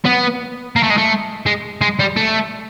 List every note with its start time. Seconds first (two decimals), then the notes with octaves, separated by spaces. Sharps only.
0.05 B3
0.76 A#3
0.83 A3
0.90 G#3
0.97 A3
1.46 G#3
1.81 G#3
2.00 G3
2.17 A3